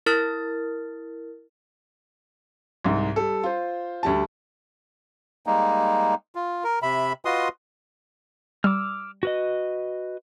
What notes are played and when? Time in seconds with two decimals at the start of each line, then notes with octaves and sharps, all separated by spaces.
0.06 E4 A#4 F6 A6
2.85 C2 G#2
3.16 G3 A4
3.43 F4 C5
4.03 D2 G3 A5
5.46 G3 G#3 A#3 D#4
6.35 F4
6.64 A#4
6.82 C3 E5 B5
7.25 F4 F#4 B4 D#5 C6 D#6
8.64 G3 D6 E6 F6
9.23 F#4 B4 D#5